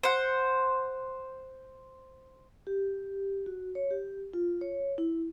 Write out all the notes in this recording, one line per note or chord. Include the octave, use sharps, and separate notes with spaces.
C5 F#5
G4
F#4
C#5
G4
F4
C#5
E4